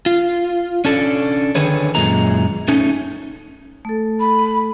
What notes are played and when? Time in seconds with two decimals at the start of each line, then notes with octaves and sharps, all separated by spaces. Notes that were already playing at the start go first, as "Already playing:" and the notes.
0.06 F4
0.85 C#4 D4 A4
1.55 D3 D#3 G#4 B4 C#5
1.95 F#2 A#2 G#3 A#5
2.68 A3 C#4 D#4
3.85 A3 A4
4.20 B5